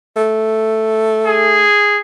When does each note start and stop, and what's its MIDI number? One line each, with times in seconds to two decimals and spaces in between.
0.16 1.67 57
1.27 2.00 68